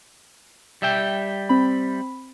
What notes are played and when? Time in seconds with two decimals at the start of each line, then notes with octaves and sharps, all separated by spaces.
0.82 G3 E5 G5
1.49 C4 B5